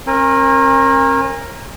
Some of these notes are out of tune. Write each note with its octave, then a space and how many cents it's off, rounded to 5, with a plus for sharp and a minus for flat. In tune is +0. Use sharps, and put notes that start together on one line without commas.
C#4 -45 A#4 +0 G#5 -35